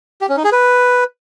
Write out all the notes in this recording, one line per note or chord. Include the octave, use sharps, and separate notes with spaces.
G4
C#4
D#4
G#4
B4